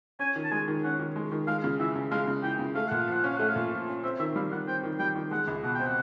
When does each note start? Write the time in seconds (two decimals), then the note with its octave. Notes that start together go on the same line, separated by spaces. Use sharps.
0.19 C#4 G#5
0.36 D#3
0.44 A5
0.51 G#3 G#5
0.68 D#3
0.84 C#4 F#5
0.99 D#3
1.16 G#3
1.32 D#3
1.47 G#3 F5
1.64 C#3
1.80 E3 E5
1.96 C#3
2.11 G#3 F5
2.27 C#3
2.43 E3 G5
2.59 C#3
2.75 A3 F5
2.88 A#2 F#5
3.00 F5
3.08 F3 F#5
3.24 C#4 F5
3.36 A3 F#5
3.49 F5
3.56 A#2
3.71 F3
3.88 C#4
4.04 C4 E5
4.19 D#3 E5
4.36 G3 F5
4.52 D#3 F#5
4.67 C4 G5
4.83 D#3
4.99 G3 G5
5.16 D#3
5.31 G#3 F#5
5.47 C#2
5.63 B2 F#5
5.75 G5
5.80 C4
5.87 F#5